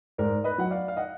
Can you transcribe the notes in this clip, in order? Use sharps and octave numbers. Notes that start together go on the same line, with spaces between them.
G#2 A#4 D5
B4 D#5
F#3 F#5
D5 F5
F5
D#5 F#5